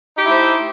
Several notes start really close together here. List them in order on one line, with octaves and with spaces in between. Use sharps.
D#4 G4 E4 A3 C5